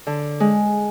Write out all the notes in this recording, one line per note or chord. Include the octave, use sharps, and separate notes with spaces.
D3
G#3